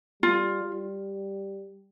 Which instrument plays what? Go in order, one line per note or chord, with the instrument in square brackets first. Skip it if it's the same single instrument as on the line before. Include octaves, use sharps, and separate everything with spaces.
[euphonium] G3 [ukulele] F4
[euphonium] G3